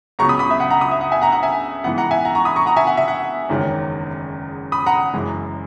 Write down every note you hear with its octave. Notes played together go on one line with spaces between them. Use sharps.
C#2 C#3 F#3 B3 A#5 C#6
B5 D#6
B5 D#6
E5
F#5
F#5 A#5
B5 D#6
E5
F#5
E5 G#5
F#5 A#5
F#5 A#5
E5 G#5
G#2 E3 B3 F#5
F#5 A#5
E5 G#5
F#5 A#5
A#5 C#6
B5 D#6
A#5 C#6
F#5 A#5
E5 G#5
F#5
E5
F#5
F#1 E2 D#3 G#3 C#4
B5 D#6
F#5 A#5
F#1 F#2 E3 G#3